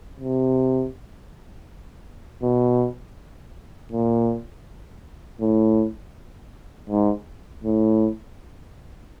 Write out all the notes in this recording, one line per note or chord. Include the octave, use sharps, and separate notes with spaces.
C3
B2
A#2
A2
G#2
A2